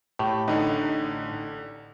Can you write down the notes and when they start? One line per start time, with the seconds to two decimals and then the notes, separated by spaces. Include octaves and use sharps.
0.19 A2 G4
0.48 A1 D3 D#4